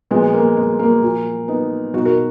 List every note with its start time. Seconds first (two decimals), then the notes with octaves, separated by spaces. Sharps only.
0.11 A#2 F3 G#3 B3
0.34 A#3
0.57 G#3
0.79 A#3
1.02 A#2 F3
1.48 B3 D#4
1.93 B2 D#4 F#4
2.05 F#4 A#4